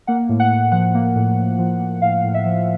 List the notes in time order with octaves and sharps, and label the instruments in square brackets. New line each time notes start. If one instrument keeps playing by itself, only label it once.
[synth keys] A#3 F#5
A2
F#5
A2
F3 F#5
A#3
A2
A2
F3
A#3
A2 F5
A2
E5
F3